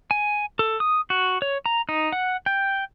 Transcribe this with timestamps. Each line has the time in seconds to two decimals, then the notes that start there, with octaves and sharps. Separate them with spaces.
0.11 G#5
0.59 A4
0.80 D#6
1.10 F#4
1.42 C#5
1.66 A#5
1.89 D#4
2.12 F#5
2.46 G5